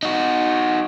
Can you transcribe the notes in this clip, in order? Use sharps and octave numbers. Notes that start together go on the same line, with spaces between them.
D#4 F#4